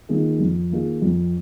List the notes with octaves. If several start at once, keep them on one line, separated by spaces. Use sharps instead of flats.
D#3 A#3 F4 G#4
F2
D#3 A#3 F4 G#4
F2